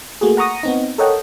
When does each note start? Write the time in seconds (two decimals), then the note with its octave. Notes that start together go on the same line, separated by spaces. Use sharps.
0.21 A3 A#3 F#4 G#4
0.37 F#5 A#5 C#6 D#6 A#6
0.63 B3 C4 D#4
0.98 A4 A#4 C#5 D#5 F#5 G5